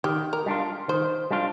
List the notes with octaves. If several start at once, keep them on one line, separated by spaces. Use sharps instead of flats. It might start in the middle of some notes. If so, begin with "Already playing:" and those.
D#3 G4
A#4
G3 D4 F4
D#3 C5
G3 D4 F4